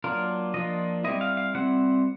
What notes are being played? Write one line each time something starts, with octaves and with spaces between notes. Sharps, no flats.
F#3 A#3 D4 F4 A#4
F3 A#3 D4 F4 D#5
G3 C4 E4 D#5
F5
F5
G3 C4 E4 F#5